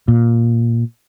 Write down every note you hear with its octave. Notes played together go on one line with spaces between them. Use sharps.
A#2